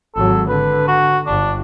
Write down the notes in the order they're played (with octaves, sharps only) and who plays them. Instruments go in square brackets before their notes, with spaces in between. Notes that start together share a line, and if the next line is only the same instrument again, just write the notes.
[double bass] G#1 F#3 [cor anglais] A4
[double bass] D3 [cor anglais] B4
[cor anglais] F#4
[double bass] G1 [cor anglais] D4